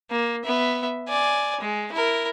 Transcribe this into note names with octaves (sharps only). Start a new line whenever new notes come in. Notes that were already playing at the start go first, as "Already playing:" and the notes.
A#3
B3 E5
D5 G#5
G#3
E4 A#4